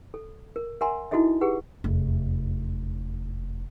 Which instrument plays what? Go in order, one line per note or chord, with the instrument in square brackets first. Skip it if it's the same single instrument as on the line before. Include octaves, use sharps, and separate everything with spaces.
[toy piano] A4
A#4
A#4 E5 F#5 G#5 A#5 C6
D#4 E4 F#4 A4 D#5 E5
G4 G#4 B4 F#5
[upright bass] F1 E2